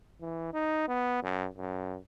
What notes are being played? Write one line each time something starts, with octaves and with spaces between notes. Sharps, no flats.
E3
D#4
B3
F#2
F#2